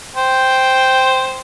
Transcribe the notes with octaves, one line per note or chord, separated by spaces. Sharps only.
C5 G5